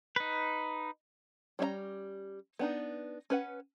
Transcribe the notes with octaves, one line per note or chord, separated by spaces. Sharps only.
D#4 B4
G3 C#4 E5 A#5
B3 D4 D#4
C#4 B4 F#5